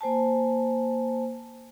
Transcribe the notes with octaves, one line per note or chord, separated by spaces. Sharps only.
A#3 C5 G#5 A5